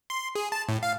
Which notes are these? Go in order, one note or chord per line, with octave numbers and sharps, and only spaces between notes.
C6
G#4
A5
A2
F5